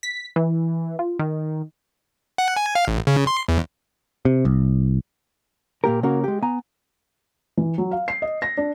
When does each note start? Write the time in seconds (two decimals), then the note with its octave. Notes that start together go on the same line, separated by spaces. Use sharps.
0.03 B6
0.36 E3
0.99 F4
1.19 D#3
2.38 F#5
2.56 G#5
2.75 F5
2.88 A1
3.07 C#3
3.27 C6
3.48 E2
4.25 C3
4.45 C2
5.84 A#2 A#3 G4 A#4
6.03 C#3 A#3 C#4 F#4 A#4
6.24 G#3 G4
6.42 B3 G#5 A#5
7.57 E3
7.78 F#3
7.91 F5
8.08 C7
8.22 D#5
8.42 A#6
8.57 D4